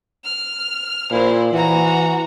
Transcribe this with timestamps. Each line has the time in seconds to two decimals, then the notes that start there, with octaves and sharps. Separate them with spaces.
0.24 F6
1.11 A#2 E4 C5
1.53 E3 F#4 A#5